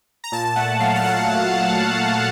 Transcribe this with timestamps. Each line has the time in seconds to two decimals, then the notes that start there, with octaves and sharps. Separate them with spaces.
0.24 A#5
0.32 A#2 A5
0.56 A3 F#5
0.80 F#3 F5
0.96 A5
1.04 F#5